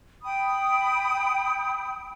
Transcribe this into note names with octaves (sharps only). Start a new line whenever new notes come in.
G5 B5 D#6